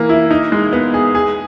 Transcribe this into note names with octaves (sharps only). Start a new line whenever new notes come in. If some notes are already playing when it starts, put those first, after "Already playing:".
Already playing: E3 A#3
E4
D#4
G#3
B3
G#4
G#4